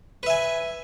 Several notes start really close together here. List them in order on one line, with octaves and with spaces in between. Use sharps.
B4 E5 G#5